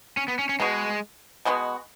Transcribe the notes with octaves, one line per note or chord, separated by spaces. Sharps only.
C#4
B3
C#4
C#4
B2 G#3 B3 F#4
B2 G#3 B3 F#4